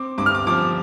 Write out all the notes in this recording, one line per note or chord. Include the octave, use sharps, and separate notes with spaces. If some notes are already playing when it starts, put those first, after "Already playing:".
Already playing: C4 D6
G2 D6
F6
D6
F3 D6